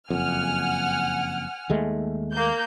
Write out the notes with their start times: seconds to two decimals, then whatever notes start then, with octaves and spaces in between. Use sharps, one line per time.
0.10 F#1 F2 F#5 G#5 F6
1.70 D#2 G#3 A3
2.33 A#3 G6